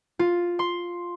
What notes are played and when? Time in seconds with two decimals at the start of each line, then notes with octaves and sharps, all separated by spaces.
0.19 F4
0.59 C6